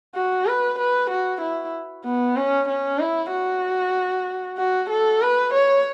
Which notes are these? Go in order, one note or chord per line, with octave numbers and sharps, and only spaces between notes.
F#4
B4
B4
F#4
E4
B3
C#4
C#4
E4
F#4
F#4
A4
B4
C#5